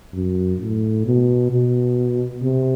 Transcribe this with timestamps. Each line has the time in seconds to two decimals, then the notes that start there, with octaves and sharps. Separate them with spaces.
0.14 F#2
0.60 A2
1.06 B2
1.51 B2
2.43 C3